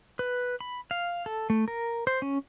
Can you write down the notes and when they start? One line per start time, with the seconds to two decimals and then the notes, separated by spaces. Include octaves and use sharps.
0.19 B4
0.61 B5
0.91 F5
1.26 A4
1.50 A3
1.68 A#4
2.07 C5
2.22 C#4